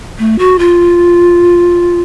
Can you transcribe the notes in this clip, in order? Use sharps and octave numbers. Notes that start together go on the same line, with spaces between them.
A3
F#4
F4